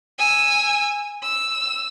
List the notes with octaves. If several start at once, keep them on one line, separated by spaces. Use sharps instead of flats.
G#5 E6
E6